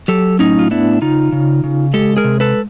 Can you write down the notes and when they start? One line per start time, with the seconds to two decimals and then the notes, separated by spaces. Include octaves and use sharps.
0.08 F#3 G4 A4
0.39 A2 C#4 D#4
0.59 F4
0.71 B3 D4 E4
1.01 C#3 D#4 F4
1.32 C#3
1.64 C#3
1.94 G#3 G4 A4
2.17 G#4 A#4
2.24 C3
2.40 A4 B4